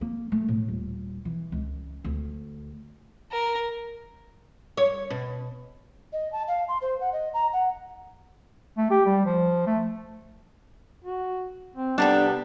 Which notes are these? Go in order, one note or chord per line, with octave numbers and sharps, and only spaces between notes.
A#3
A3
A2
D#1
E3
C#2
D2
A#4
C#5
B2
D#5
A5
F5
C6
C5
F#5
D#5
A#5
F#5
A3
G4
G3
F3
A3
F#4
C4
C3 G3 B3 D4 A4